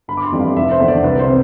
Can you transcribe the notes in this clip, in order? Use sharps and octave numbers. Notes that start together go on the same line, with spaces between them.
G1 B5
D6
C6
F2 E3 G3
F5
F1 E5
C5
E2 D3
D5
C2 B4
C5
C3